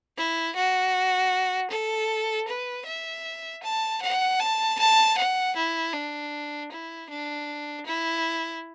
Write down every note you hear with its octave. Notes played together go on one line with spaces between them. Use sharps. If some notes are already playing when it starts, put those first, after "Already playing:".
E4
F#4
A4
B4
E5
A5
F#5
A5
A5
F#5
E4
D4
E4
D4
E4